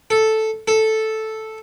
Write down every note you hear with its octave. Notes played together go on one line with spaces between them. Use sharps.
A4
A4